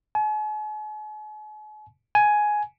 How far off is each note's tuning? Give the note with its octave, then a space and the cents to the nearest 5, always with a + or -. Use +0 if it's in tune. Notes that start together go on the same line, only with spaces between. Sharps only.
G#5 +45
G#5 +10